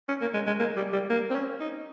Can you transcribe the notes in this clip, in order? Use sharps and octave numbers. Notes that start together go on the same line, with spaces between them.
C#4
A#3
G#3
G#3
A#3
G3
G3
A#3
C4
C#4
D#4